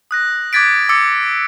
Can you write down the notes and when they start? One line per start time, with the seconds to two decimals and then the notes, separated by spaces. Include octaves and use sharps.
0.11 D#6 F#6 A#6
0.53 D6 F#6 G#6 A6 B6 D7
0.89 D6 E6 A6 C#7